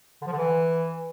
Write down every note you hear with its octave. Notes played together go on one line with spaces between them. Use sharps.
D3
F3
D3
E3